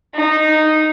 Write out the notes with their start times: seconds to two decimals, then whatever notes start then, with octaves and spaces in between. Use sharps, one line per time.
0.15 D#4